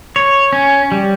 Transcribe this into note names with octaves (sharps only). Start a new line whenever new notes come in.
C#5
C#4
G3